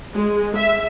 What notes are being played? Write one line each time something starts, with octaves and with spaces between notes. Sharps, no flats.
G#3
E5